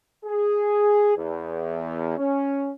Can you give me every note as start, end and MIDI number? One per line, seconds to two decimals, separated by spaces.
0.25 1.17 68
1.17 2.15 40
2.18 2.71 61